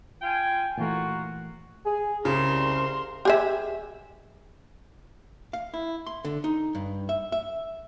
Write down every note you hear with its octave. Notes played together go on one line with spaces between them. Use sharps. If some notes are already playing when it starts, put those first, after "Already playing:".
F4 G5 G#5
A#2 E3 A3 A#3 F4 F#4
G#4
C2 C#3 A#4 C6
G4 G#4 E5
F5
E4
C6
D3
D#4
G2
E5
E5